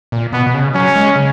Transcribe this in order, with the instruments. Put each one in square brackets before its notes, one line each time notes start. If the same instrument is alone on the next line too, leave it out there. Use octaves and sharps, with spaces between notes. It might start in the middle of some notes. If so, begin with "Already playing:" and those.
[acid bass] A#2
[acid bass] B2 [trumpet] B3
[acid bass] B2
C#3
[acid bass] F#3 [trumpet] C#4
[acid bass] G#3
C#3